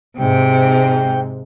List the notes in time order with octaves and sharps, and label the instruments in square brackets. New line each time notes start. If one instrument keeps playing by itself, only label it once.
[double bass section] G#2 [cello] C3 [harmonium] G5